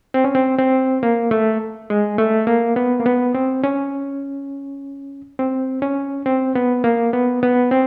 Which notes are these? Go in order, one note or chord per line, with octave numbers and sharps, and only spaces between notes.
C4
C#4
C4
C4
A#3
A3
G#3
A3
A#3
B3
A#3
B3
C4
C#4
C4
C#4
C4
B3
A#3
B3
B3
C4